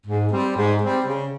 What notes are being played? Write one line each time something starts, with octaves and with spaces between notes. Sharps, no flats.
G#2
G3 C4
G#2
G3 C4
C#3